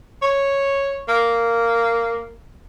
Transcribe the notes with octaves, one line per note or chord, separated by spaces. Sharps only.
C#5
A#3